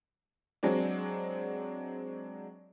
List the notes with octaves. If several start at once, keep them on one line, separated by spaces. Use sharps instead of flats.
F#3 G#3 C4 D4